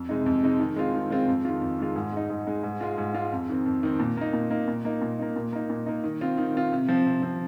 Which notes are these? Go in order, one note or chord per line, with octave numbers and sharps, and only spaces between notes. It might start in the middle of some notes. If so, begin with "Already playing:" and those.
Already playing: F2
C3 G#3 D#4
F2
C3 G#3 D#4
D#3
G#3 C4 F4
D#3
G#3 C4 F4
F2
D#3 G#3 F4
F2
D#3 G#3 F4
G#2
G#3 D#4
G#2
G#3 D#4
G#2
G#3 F4
G#2
G#3 F4
F2
D#3 C4
F2
D#3 C4
A#2
A#3 D#4
A#2
A#3 D#4
A#2
A#3 D#4
A#2
A#3 D#4
A#2
A#3 D#4
A#2
A#3 D#4
D#3
C4 F4
D#3
C4 F4
C3
F3 C4
C3
F3 C4